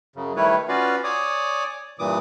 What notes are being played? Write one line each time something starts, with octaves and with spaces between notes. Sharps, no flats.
F#2 C#3
D#3 G3 A3 E4 B4 C#5
C#4 F4 F#4 B4 D5 F5
C#5 D5 G#5 D6 D#6
G2 A#2 E3 D6 D#6